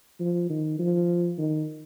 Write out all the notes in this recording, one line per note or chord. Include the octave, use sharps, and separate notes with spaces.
F3
D#3
F3
D#3